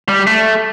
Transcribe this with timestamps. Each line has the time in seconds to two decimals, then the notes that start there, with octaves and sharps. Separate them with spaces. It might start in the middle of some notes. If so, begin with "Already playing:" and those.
0.09 G3
0.27 A3